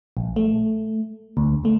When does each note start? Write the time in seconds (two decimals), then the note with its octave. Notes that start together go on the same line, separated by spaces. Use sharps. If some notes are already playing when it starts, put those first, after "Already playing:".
0.17 A#1
0.36 A3
1.37 D2
1.64 D2 A3